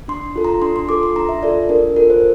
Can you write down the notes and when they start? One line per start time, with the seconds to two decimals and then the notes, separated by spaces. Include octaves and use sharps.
0.08 D4 C6
0.36 F4 A4
0.45 A#5
0.62 D4 C6
0.76 C6
0.89 F4 A4 D6
1.03 C6
1.16 D4 A#5
1.29 E5
1.43 F4 A4 D5
1.69 D4 A#4
1.96 F4 A4 A#4
2.10 C5